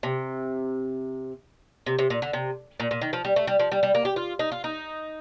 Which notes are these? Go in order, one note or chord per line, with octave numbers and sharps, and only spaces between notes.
C3
C3
C3
A#2
D3
C3
A#2
A#2
D#3
F3
G3
A3
G3
F3
G3
G3
A#3
G4
F4
D#4
F4
D#4